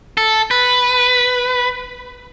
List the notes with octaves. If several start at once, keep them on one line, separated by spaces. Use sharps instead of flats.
A4
B4